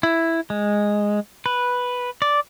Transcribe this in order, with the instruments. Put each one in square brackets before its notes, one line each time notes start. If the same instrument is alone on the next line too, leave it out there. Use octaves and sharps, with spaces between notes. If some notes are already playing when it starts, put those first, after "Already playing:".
[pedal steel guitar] E4
G#3
B4
D5